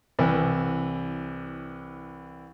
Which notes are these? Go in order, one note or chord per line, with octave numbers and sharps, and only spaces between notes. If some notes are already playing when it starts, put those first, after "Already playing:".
C2 E3